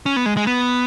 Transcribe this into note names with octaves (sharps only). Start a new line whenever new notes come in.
C#4
B3
G#3
G#3
B3